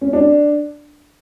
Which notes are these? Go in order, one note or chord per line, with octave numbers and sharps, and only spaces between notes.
C#4
D4